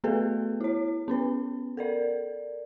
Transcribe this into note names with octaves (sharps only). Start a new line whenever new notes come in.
A3 B3 F#4 G#4 A4 B4
E4 C#5
B3 C#4 B4
A4 A#4 D5